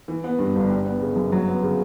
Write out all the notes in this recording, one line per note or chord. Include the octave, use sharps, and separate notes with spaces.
E3
B3
G2
G1
G3
B3
C#3
F#2
F#3
B3
C#3